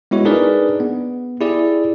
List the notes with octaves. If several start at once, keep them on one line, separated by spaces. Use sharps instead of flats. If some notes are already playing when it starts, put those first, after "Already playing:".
G#3 B3 E4 F#4 C#5
D4 D#4 G#4 A#4 B4 D5
B3
E4 G4 G#4 D5